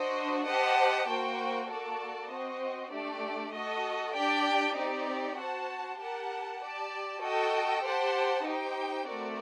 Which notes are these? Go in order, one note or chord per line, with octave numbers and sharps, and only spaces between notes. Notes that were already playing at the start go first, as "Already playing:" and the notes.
Already playing: D4 F#4 C5 D#5
G4 C5 D#5 F#5 A5
A#3 F#4 C5 G5
A#3 F#4 A4 D5 A5
C4 F#4 C5 D#5
A3 D4 G4 D5
F#4 A4 D#5
D4 G4 D5 G5
C4 D#4 G4 D5
F#4 C5 F#5 A5
G4 A#4 F#5 A5
G4 D5 A5
F#4 A4 D#5 G5
G4 C5 F#5 A5
D#4 G4 C5 G5
A3 C4 F#4 A#4 D5